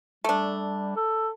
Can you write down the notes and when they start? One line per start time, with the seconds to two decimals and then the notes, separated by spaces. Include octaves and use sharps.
0.24 G3 A3 D4
0.96 A4